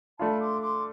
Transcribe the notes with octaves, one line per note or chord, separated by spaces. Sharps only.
A3 D4 F4 A5 B5
C6 D6
C6 D6